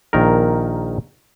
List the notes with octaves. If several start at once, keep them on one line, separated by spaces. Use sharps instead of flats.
A#1 D#3 A#4